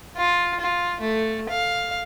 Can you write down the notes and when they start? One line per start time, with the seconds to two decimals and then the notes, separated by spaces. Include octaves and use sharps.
0.17 F4
0.60 F4
1.01 A3
1.50 F5